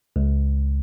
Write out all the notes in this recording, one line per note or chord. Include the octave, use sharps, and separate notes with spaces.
C#2